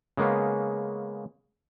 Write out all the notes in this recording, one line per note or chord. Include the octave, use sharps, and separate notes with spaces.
C#3 G#3 A#3 B3 C#4